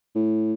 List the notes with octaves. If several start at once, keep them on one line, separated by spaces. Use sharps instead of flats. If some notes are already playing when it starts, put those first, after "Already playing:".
A2